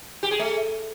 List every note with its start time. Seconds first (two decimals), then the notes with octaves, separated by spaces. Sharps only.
0.23 G4
0.31 G#4
0.39 A3